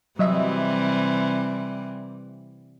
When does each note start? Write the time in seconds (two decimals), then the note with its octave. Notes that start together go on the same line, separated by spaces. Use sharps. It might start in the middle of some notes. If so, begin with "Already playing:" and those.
0.19 C3 E3 F#3 G3 D#5 E5